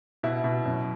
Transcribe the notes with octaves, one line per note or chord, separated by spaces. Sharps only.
B2 E4
B2
F#2